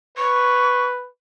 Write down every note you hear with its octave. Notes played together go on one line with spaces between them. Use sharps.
B4 C#6